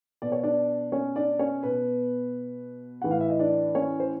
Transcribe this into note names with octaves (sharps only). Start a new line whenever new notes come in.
B2 D5
C#5
D4 D5
C#4 C#5
D4 D5
C#4 C#5
B2 B3 B4
A2 E3 F#5
F5
E5
D#5
D4 D5
C#4 C#5
C5